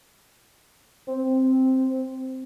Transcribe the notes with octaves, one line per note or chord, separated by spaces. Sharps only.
C4